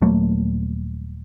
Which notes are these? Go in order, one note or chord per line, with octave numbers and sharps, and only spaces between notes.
D#1 F#3 A3 A#3